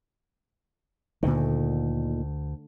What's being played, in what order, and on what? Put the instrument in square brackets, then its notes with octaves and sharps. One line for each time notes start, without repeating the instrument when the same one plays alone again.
[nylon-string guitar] D2 [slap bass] A#2 D3 D#3